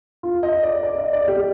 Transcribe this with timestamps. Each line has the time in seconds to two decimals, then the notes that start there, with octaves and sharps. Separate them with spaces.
0.23 F4
0.43 D#5
0.63 D5
0.83 D5
0.98 D#5
1.13 D5
1.28 G4